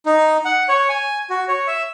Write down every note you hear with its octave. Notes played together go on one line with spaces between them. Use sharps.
D#4
F#5
C#5
G#5
F#4
C#5
E5